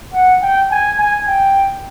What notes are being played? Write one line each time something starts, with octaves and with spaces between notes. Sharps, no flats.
F#5
G5
G#5
G#5
G5